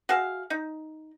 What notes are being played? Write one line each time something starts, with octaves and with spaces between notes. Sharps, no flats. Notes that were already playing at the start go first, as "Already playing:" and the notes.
F#4 G#4 E5 F5
D#4